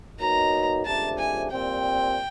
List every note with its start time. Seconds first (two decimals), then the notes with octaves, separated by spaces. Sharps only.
0.19 B2 F#3 A#3 D#4 A#5
0.86 C#2 C3 F3 A3 D4 A5
1.19 G#5
1.51 A#2 G3 C4 G5